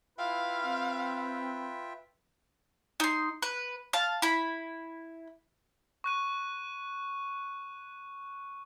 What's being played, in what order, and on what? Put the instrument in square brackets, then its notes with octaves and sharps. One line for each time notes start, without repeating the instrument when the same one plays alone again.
[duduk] E4 [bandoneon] F4 E5 G5 [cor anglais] B4 [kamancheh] F5
[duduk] C4
[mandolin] D#4 C6
B4
F5 A5
E4 B5
[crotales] C#6 F#6 D#7